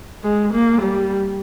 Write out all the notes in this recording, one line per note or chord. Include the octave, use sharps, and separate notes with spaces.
G#3
A#3
G3